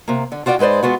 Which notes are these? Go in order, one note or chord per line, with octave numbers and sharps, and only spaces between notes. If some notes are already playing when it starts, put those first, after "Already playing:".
C3 A#3
D3
F4 F#4 D5 F5 G5
G#2 G#3 B4 C5 D5
G#3 B3 F4 F#4